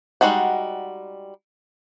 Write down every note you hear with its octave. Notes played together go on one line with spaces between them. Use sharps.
G3 G#3 D#4 F#4 F#5